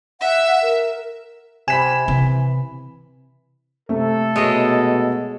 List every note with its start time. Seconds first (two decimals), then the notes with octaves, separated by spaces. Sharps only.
0.21 E5 F#5
0.62 A#4
1.68 C3 G#5 B5 B6 E7
2.08 C3 E3
3.89 C3 A3 A4
4.36 B2 G#3 C#5 D#5